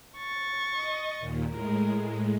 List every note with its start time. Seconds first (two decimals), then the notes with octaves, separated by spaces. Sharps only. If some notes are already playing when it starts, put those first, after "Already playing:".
0.18 C#6 A6
0.73 D#5
1.20 D#2 A#2
1.50 A2 G#3 A#4